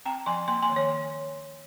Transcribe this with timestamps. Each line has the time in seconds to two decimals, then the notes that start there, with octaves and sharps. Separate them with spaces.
0.05 C4 G5 A#5
0.26 F3 G#5 C6
0.48 A#3 G#5 C6
0.62 G#5 C6
0.70 D#3
0.76 C#5